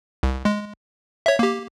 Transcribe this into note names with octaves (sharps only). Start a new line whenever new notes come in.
C2
G#3
C#5 E5
A#3 G4